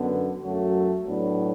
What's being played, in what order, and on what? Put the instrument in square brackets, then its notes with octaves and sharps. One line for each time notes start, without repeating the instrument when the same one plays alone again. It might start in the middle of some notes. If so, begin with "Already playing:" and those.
Already playing: [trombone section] F#2 D3 B3
F#2 F#3 A3 F#4
A2 F#3 B3 D4